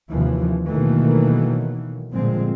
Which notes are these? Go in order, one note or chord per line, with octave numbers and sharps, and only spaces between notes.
D#2 C3 E3 F3
B2 D#3 E3 F#3 A3 A#3
G1 A#2 D3 F3 G#3 C4